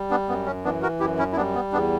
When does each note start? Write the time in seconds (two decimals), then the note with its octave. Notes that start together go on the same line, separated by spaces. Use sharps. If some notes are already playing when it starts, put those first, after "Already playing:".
Already playing: G3
0.10 B3 D4
0.28 F#2 B3
0.46 C#4
0.64 E3 B3 D4
0.82 F#4 A#4
1.00 F#2 E4 G4
1.18 C#4 E4
1.32 E4
1.36 G3 B3 D4
1.55 B3
1.72 E2 B3 D4